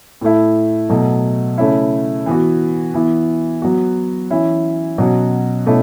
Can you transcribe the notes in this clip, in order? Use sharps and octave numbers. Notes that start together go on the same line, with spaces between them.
A2 A3 E4
B2 F#3 A3
C#3 A3 C#4 E4
E3 B3 F#4
E3 B3 E4
F#3 B3 F#4
E3 C#4 E4
B2 F#3 C#4 F#4
B2 A3 C#4 E4